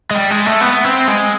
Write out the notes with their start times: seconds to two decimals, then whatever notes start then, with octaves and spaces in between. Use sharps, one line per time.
0.11 G#3
0.15 G3
0.31 G#3
0.46 A3
0.61 B3
0.84 C4
1.08 G#3